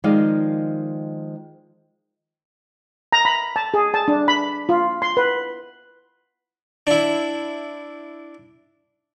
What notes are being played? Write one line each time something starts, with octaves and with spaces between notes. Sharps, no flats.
D#3 F3 G#3 D5 D#5 F5
A#5
B5
A5
G#4
A5
D4
B5
F4
C6
B4
D4 E4